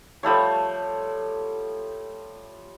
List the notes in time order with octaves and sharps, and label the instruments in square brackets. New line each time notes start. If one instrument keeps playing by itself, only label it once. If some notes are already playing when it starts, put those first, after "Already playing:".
[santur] F3 G3 A3 C#5